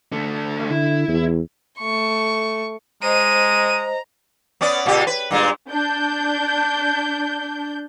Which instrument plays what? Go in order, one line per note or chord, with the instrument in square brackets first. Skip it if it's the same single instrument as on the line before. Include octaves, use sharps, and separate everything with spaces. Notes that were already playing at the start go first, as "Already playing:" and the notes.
[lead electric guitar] D3 A3
[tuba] D3 [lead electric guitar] E4
[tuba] E2
[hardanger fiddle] A3 C#6
[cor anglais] G#3 [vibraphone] C5 D#5 [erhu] A#5 [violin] D#7
[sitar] B3 C#4 D5
A#2 C#3 G4
B4
G2 A#2 G#3
[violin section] D4 G6